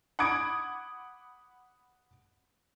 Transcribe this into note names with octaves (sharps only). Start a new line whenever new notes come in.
F#5 B5 D6 D#6 G#6 D7